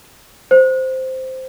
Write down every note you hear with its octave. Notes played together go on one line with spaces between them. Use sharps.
C5